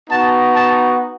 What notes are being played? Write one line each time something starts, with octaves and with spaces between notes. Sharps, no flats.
B3 D#4 F#4 A5
A5